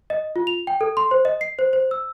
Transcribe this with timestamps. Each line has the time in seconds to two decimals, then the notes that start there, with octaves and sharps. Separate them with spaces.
0.10 D#5
0.36 F4
0.47 F7
0.67 G5
0.81 A4
0.97 C6
1.11 C5
1.25 D#5
1.41 C7
1.59 C5
1.73 C5
1.91 E6